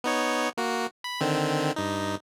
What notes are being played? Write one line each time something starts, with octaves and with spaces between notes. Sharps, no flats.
B3 D#4 C#5
A#3 F#4
B5
D3 D#3 C4
G2 D#4